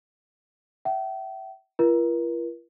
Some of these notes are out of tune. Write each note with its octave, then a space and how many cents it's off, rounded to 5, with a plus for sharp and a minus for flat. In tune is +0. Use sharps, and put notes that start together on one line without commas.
E5 +15 G5 -40
F4 -45 A#4 +45